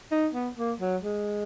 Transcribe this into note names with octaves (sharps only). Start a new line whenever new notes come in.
D#4
B3
A#3
F#3
G#3